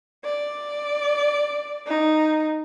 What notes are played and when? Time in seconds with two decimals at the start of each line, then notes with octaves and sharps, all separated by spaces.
0.25 D5
1.87 D#4